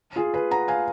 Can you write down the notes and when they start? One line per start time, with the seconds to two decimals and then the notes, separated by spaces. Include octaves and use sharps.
0.16 F4 G#4
0.34 G#4 B4
0.51 F#5 A#5
0.68 F5 G#5